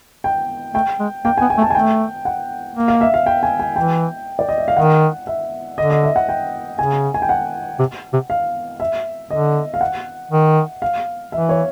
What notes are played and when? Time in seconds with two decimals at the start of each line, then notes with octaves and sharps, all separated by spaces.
0.24 G5
0.74 A3 G5
1.00 G#3
1.25 A#3 G5
1.37 G#5
1.41 B3
1.50 G#5
1.58 A3
1.62 A5
1.70 G#5
1.75 A3 G5
2.25 F#5
2.76 A#3
2.88 F5
3.01 E5
3.14 F5
3.26 G5
3.43 G#5
3.60 G#5
3.76 E3 G5
4.39 D5
4.49 D#5
4.58 E5
4.68 F5
4.77 D#3 F#5
5.27 E5
5.78 D3 D#5
5.91 D#5
6.03 E5
6.16 F#5
6.29 G5
6.79 C#3 G#5
7.14 G#5
7.22 G5
7.29 F#5
7.79 C3
8.13 C3
8.30 F5
8.80 E5
9.30 D3 D#5
9.74 F5
9.81 F#5
10.31 D#3
10.82 F5
11.32 E3 E5
11.49 C#5